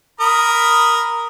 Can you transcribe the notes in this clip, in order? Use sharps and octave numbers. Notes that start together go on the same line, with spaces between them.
A#4 B5 D#6